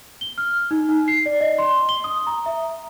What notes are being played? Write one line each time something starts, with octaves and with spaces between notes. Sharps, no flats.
G7
F6
D#4
D#4
C7
D5
D#5
C6
G7
D#6
A#5
E5